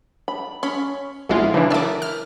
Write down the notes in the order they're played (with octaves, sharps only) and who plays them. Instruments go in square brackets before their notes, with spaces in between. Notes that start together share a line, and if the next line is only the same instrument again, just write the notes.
[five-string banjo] B5
[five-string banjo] C#4 [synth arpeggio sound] B5
[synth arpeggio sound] A#1 G#3 F4 [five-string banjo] E3 B3 E4
[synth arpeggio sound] C#3 E3 D4 [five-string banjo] F#3
[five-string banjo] D4 E4 A#4 [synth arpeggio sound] D6 E6
[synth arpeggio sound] F6